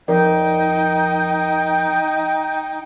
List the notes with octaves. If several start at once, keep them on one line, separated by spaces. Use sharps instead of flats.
F2 D#4 A#4 D5 G5